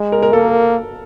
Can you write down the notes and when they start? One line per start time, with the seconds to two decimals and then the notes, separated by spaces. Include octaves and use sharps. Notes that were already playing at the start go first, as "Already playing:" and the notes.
Already playing: G#3
0.12 A#4
0.22 A#4
0.33 A#3 A4